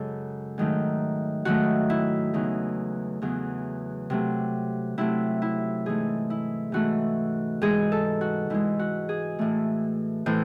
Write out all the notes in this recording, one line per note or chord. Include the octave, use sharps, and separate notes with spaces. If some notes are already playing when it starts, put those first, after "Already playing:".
Already playing: F#2 C#3 G#3 A4
G#2 D#3 F#3 A3
G#2 D#3 F#3 A3 F#4
E4
E2 C#3 F#3 D#4
E2 C#3 F#3
C3 F#3 A3
C3 F#3 A3 E4
E4
G#2 E3 A3 G#4
E4
G#2 E3 A3 F#4
G#2 E3 G#3 G#4
A4
F#4
G#2 E3 G#3 E4
F#4
G#4
A2 E3 A3
A2 E3 A3 C5